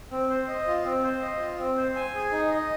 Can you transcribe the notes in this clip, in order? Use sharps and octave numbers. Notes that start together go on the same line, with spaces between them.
C4
C5
D#5
F4
C4
C5
D#5
F4
C4
C5
G#5
G#4
D#4
D#5